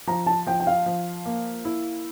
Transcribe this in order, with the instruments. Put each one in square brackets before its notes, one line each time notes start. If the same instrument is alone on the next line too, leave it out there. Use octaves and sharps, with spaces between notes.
[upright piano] F3 [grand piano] A#5
[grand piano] A5
[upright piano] F3 [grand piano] G5
[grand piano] G5
F5
[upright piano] F3
A#3
E4